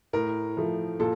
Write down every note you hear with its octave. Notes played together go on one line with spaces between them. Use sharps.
A2 A#4
F3 A3
A#2 A4